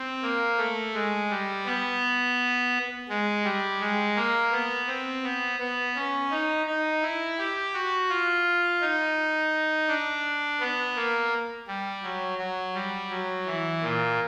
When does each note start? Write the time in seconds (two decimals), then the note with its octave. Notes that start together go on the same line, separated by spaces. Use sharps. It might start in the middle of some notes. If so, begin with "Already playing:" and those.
Already playing: C4
0.22 A#3
0.58 A3
0.94 G#3
1.30 G3
1.66 B3
3.09 G#3
3.44 G3
3.80 G#3
4.16 A#3
4.52 B3
4.88 C4
5.23 B3
5.60 B3
5.95 C#4
6.31 D#4
6.66 D#4
7.02 E4
7.38 G4
7.74 F#4
8.10 F4
8.81 D#4
9.88 D4
10.60 B3
10.96 A#3
11.68 G3
12.03 F#3
12.39 F#3
12.75 G3
13.10 F#3
13.47 E3
13.82 A#2